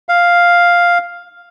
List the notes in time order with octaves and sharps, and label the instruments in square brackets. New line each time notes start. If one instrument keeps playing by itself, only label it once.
[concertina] F5